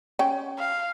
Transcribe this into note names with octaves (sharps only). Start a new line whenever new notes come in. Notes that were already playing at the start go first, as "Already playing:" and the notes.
C#4 G5
F5